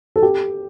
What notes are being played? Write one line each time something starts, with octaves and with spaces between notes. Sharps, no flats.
A4
G4